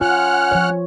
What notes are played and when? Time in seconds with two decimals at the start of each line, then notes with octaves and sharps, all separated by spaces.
0.01 C#4 F4 F#5 F6 F#6
0.52 F3 C#5